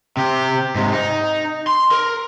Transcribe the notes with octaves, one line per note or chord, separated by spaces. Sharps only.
C3 G4
G#2 C3
D#4
C6
A#4